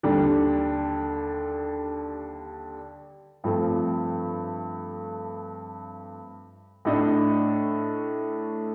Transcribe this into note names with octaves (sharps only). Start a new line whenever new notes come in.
D#2 D3 G3 D4
G2 F3 A3 C4
A2 A3 D4 A4 D#5